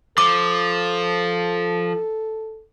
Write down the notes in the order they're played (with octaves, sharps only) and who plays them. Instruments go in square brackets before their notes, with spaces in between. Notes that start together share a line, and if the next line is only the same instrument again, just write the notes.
[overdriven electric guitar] F3 [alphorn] A4 [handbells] D6